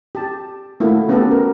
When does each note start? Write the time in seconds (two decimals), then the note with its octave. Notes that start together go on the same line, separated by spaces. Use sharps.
0.15 G4 A5
0.80 A3 A#3 E4 F#4
1.08 A3 B3 C#4 F#4 G4 A4
1.31 A#4